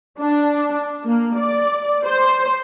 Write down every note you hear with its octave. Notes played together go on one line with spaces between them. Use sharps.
D4
A#3
D5
C5